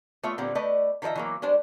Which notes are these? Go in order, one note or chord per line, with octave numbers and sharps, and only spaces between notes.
A3 B3 F4 C#5 E5
A#2 D3 G3 B3 C4
A3 B4 D5 D#5
D#3 F3 B4 D#5 E5
E3 F#3 A#3
G3 G#3 D4 C5